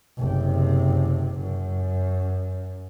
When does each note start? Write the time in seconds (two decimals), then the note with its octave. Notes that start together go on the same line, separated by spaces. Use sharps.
0.18 F#1 C3
1.39 F#2